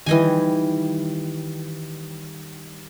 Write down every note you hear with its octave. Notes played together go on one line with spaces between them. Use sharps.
D#3 E3 G3 D#5 G#5